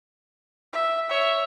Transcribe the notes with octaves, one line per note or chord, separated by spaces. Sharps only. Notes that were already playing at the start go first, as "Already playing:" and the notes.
E5
C#5 E5